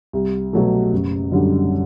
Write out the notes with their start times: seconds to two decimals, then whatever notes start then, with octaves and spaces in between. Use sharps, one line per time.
0.13 C2
0.53 B2 F#3 A3
0.93 F#1
1.32 F#2 D3 G3